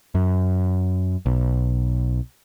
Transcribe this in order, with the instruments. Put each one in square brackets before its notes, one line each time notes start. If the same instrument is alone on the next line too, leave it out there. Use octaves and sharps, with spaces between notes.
[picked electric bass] F#2
B1